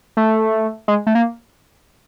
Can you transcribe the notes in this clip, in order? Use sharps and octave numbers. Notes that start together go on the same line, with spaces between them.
A3
G#3
A3
A#3